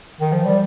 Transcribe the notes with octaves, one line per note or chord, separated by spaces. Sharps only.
D#3
F3
G3